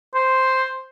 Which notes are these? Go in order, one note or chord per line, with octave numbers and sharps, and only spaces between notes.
C5